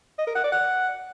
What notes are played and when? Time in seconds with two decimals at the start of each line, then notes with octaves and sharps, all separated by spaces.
0.18 D#5
0.27 A#4
0.35 F#5
0.44 D5
0.52 F#5